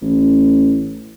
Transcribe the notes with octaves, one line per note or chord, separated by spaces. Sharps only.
A1